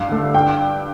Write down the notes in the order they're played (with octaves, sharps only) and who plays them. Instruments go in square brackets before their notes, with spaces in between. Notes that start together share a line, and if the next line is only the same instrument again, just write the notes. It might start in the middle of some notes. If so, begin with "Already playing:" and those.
Already playing: [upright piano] G2 F5
D3 A3
G2 G5